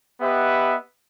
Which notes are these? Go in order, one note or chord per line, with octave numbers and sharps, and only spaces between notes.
B3 G4 B4 D#5 E5 F#5